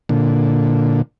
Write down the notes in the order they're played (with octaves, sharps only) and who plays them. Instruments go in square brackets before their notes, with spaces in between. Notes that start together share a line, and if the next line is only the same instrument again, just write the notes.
[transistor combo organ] A#2 D3